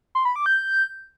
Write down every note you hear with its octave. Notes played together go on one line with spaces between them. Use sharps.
C6
B5
D6
G6